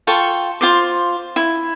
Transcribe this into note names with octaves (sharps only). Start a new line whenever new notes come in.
F4 A4 G5 C#6
F4 C5 D6
E4